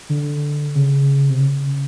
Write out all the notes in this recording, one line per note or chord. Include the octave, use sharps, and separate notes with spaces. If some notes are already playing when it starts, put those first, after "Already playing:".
D3
C#3
C3
C#3